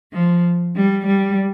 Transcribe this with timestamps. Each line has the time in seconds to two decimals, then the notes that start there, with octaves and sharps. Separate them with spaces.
0.12 F3
0.74 G3
1.06 G3